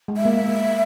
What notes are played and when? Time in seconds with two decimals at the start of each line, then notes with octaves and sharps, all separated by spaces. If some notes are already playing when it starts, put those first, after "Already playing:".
0.08 G#3
0.17 E5
0.25 A#3